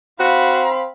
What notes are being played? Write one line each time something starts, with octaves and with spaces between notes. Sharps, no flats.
C4 F#4 F5 B5